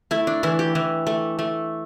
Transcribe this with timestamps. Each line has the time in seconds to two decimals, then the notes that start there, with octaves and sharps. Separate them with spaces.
0.11 A3 E4
0.27 D4
0.43 E3 E4
0.59 G4
0.75 E3
1.07 A3
1.39 A3